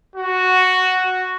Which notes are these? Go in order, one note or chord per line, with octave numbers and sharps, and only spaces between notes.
F#4